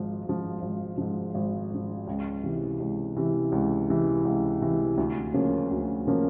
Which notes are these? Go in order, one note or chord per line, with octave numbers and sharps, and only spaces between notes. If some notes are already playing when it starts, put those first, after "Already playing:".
Already playing: G#1 G#2 F3
G#2 F3
G#1
G#2 F3
G#1
G#2 F3
C#2
C3 E3
C#2
C3 E3
C#2
C3 E3
C#2
C3 E3
D2
C#3 F3 A#3 C#4
D2
C#3 F3 A#3 C#4